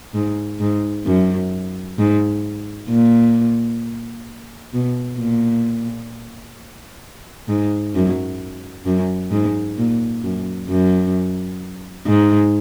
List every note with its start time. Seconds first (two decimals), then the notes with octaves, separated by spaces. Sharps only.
0.14 G#2
0.60 G#2
1.06 F#2
1.99 G#2
2.89 A#2
4.73 B2
5.19 A#2
7.49 G#2
7.95 F#2
8.86 F#2
9.31 G#2
9.78 A#2
10.24 F#2
10.69 F#2
12.07 G#2